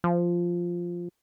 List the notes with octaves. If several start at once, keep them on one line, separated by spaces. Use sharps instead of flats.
F3